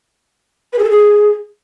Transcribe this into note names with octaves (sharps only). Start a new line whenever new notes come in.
B4
G#4
A4
G#4